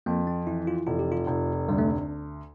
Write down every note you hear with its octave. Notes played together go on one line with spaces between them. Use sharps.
F2 A#3
C4
E3 E4
F4
F1 F4
G4
F4
F1
D2 G3
A3